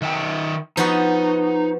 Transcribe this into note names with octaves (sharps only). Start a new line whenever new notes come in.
D#3 E5 G5
F3 B3 D#4 F#4